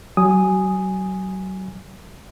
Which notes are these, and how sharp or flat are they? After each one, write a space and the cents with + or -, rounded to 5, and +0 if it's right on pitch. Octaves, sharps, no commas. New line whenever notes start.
F#3 +30 G#5 +0 D#6 +0